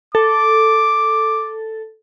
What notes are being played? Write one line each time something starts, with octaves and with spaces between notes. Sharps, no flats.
A4 D6